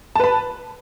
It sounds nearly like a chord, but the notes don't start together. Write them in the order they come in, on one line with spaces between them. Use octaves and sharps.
A5 B4 B5